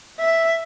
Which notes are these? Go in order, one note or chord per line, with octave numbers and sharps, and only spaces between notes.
E5